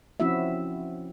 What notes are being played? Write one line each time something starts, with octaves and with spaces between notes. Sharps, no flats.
F3 C4 C#4 E4 F#4 E5